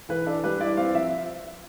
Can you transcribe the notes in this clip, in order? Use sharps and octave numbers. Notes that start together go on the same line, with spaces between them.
E3 B4
D4 A4
G3 B4
E4 D5
C4 F5
F3 E5